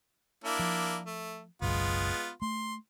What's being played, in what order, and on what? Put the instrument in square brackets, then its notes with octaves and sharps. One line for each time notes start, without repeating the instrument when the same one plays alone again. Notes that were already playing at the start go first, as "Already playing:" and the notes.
[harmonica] A#3 D4 E4
[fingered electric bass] F3
[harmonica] A3
[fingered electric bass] F#1 B1 F#2 [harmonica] G#3 B3 F4
[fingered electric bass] A3 [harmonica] C6